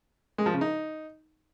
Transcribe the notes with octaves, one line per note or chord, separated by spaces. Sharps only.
G#3
F3
C#3
D#4